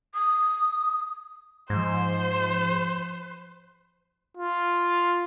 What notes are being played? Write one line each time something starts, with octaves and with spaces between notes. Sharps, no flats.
D#6
G#2 F3 C5
F4